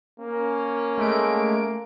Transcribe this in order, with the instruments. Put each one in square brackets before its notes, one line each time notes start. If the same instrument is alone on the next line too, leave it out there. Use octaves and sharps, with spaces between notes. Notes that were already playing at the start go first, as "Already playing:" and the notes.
[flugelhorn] A#3 [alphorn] C#4
[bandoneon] G#3 [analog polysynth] A3 D7